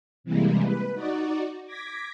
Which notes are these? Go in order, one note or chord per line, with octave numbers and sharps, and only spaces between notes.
C3 E3 G3 G#3 A#3
B4
D#4 F#4 D5
D6 G#6 A#6 B6